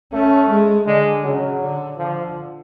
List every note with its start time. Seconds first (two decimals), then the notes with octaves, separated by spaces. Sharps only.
0.13 A3 C#4
0.50 G#3
0.86 D3 G#3
1.24 C#3 F#3
1.61 D3
1.98 D3 F3